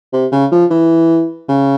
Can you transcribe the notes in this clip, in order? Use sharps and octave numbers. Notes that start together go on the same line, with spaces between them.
C3
C#3
F3
E3
C#3